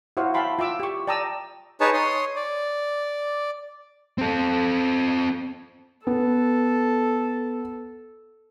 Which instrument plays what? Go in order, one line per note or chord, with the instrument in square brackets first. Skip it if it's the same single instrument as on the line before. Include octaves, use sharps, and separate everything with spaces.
[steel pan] E4 F#4 C5 C#5 F5 F#5
E5 F5 G5 A5 B5 C6
F4 E5 D6 E6
G4 C#6
D5 G5 A5 A#5 D#6 E6
[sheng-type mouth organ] D#4 G#4 B4 C#5 A5
C#5 C6 D#6
D5
[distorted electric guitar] C4 A4
[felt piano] B3 [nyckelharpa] A4